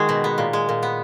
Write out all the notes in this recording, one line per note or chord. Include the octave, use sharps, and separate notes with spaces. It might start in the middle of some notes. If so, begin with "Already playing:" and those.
Already playing: D#3 G#3 F#4 G#4
B2
B3
A#2
G#3
A#2
B3